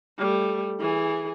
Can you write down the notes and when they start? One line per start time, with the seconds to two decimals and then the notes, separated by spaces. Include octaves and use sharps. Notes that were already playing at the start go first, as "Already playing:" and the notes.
0.19 G3 A3
0.80 E3 G#4